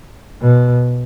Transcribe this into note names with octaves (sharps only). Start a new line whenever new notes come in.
B2